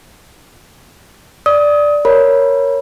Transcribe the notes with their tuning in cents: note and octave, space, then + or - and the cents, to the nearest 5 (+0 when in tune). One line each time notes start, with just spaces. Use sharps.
D5 +0 D#6 +30
A#4 +0 C#5 +0 B5 -20